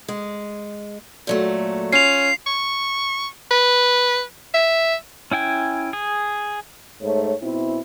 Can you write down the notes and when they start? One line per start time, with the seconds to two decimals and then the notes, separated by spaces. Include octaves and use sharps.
0.08 G#3
1.27 A#2 F#3 A3
1.92 C#4 F4 C7 F7
2.47 C#6
3.51 B4
4.54 E5
5.31 C#4 E4 G5 G#5
5.93 G#4
7.02 G#2 A3 C#5
7.42 B2 C4 E4